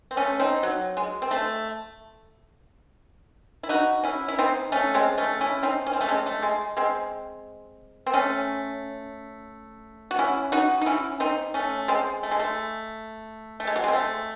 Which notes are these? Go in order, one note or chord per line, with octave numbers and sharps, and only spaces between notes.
C4
A3 C#4
C4 D#4
F#3
G#3
C4
A3
E4
D#4 F#4
C#4 E4
E4
C4 D#4
A3 C#4
G#3 C4
A3 C#4
C#4 E4
C4 D#4
C#4
C4
A3 C#4
G#3 C4
A3
G#3
G#3 C4
C4
A3 C#4
F#4
C#4 E4
D#4 F#4
D#4
C#4 E4
C4 D#4
A3 C#4
G#3 C4
A3
G#3
A3
A3
G#3
F#3
G#3 C4
A3